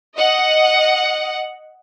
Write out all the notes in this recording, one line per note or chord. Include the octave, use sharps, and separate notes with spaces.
D#5 F#5